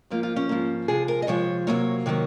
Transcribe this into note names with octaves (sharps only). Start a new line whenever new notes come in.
G#2 F3 A#3 F4
F4
C#4
G#2 F3 A#3
C3 F3 G#3 G#4
A#4
D#5
C3 F3 G#3 C#5
C3 D#3 F#3 A#3 C#5
C3 D#3 F#3 A#3 C#5